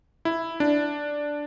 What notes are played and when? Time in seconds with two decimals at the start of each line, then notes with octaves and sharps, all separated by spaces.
0.25 E4
0.60 D4